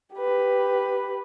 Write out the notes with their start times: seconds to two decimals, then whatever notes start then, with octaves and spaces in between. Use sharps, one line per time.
0.16 G4 B4